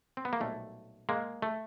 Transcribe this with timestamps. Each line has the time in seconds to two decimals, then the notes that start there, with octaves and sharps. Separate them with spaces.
0.17 C4
0.25 B3
0.33 A#3
0.40 B1 A#2 G3 A3
1.09 G#3 A#3
1.42 A3